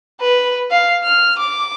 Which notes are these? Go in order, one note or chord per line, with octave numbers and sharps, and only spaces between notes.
B4
F5
F6
D6